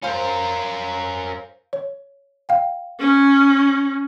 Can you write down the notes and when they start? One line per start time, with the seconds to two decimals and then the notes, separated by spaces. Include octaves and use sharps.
0.03 C#4 A#4 C5 F5
1.73 C#5
2.49 F5 G5
3.00 C#4